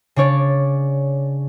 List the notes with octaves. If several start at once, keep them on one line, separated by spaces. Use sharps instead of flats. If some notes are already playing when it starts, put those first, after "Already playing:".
C#3 D4 C#5 D5